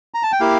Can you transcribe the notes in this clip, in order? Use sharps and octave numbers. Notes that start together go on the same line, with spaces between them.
A#5
A5
G5
A#3 E4 G4 F5